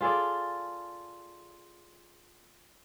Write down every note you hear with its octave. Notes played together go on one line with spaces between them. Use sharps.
F4 G#4 A4 D5